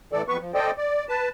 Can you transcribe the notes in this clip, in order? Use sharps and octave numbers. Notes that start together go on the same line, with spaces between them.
A2 E3 A4 D5
F2 B3 B4 C#6
F3
A4 C5 D5 D#5 G5
D5
B4 A5